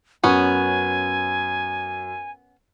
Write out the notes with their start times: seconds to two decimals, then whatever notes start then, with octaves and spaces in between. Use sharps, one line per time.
0.23 F#2 B3 C#4 G#5